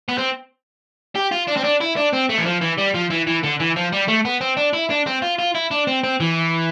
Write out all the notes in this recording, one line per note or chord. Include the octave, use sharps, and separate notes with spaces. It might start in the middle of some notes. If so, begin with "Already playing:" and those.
B3
C4
G4
F4
D4
C4
D4
E4
D4
C4
A3
E3
F3
E3
G3
F3
E3
E3
D3
E3
F3
G3
A3
B3
C4
D4
E4
D4
C4
F4
F4
E4
D4
C4
C4
E3